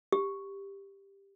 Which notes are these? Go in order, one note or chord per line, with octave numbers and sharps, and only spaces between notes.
G4